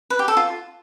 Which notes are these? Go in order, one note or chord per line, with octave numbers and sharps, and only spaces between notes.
B4
G4
A4
F4